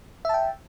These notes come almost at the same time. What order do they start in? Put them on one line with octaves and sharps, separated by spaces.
E5 A5 G5